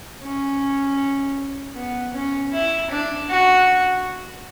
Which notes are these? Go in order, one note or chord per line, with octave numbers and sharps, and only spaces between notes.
C#4
B3
C#4
E4
D4
F#4